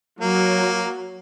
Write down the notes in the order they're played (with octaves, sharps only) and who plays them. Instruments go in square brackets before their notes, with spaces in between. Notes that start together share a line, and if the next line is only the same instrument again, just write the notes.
[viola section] F#3 [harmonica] A#3